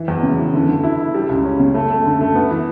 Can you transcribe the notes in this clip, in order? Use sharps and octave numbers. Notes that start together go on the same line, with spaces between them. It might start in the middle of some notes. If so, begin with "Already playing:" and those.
Already playing: E3
E2
C#3
E3
D3
D3
E4
E4
G3
C#2
C#4
C#3
A3
A3
D3
A3
B3
E3